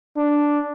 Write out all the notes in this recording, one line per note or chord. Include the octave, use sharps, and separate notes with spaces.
D4